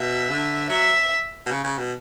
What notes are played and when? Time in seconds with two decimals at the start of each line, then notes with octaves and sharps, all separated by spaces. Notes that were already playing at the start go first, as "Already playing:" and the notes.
Already playing: B2 E5
0.29 D3
0.70 F#3 E5
1.46 B2
1.51 C#3
1.64 C#3
1.78 B2